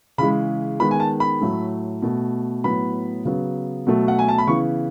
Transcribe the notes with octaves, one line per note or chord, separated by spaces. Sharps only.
C#3 E3 G#3 B5
D#3 G#3 B3 B5
G#5
A5
B5
A2 F#3 A3
B2 A3
A2 F#3 B3 B5
C#3 F#3 B3
B2 F#3 A3
F#5
G#5
A5
B5
C#3 E3 B3 C#6